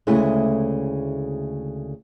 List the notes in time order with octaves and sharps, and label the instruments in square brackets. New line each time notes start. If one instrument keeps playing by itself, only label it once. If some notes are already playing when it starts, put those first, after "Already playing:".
[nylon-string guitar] D2 C#3 G#3 A3 E4